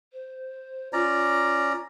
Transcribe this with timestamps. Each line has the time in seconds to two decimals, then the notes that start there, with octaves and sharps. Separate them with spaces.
0.12 C5
0.93 C#4 F4 D5 A#5